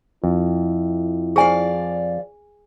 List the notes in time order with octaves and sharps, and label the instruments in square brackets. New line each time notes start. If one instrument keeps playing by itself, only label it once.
[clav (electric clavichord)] F2 [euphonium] E4
[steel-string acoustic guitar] F3 D5 F5 [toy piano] G#4 G#5